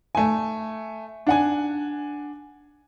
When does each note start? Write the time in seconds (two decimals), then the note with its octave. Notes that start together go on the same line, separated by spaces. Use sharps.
0.15 A3 G#5
1.27 D4 F#5 G#5